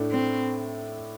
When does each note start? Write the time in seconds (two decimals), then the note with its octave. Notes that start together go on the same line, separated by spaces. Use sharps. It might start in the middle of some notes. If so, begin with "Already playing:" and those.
Already playing: A2 A3 D4
0.11 C4